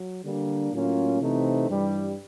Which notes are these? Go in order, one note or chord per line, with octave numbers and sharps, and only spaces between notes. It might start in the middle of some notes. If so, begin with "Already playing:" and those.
Already playing: F#3
D3 G3 A#3 D4
A2 F#3 A#3 C#4 F4
C3 E3 A3 C4 D#4
G2 E3 G3